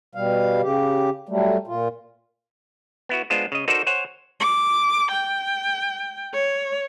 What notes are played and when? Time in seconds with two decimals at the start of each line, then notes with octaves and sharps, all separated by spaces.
0.15 B2 G3 F5
0.61 C#3 G4
1.29 F#3 G3 A3
1.67 A#2 F4
3.09 B3 E4 F#4
3.30 G#3 B3 D4 F4 C5
3.52 C#3 D#5
3.68 D#4 F#4 A4 A#4 C5 D5
3.87 C5 C#5 F#5 G#5
4.40 D6
5.11 G5
6.34 C#5